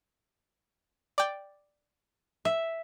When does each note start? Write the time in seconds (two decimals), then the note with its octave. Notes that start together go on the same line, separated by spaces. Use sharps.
1.18 D5 G5
2.45 E5